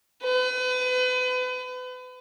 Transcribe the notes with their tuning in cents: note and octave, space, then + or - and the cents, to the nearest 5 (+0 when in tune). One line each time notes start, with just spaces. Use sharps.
B4 +35